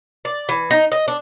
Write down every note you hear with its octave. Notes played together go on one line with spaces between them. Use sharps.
D5
E3
D#4
D#5
D4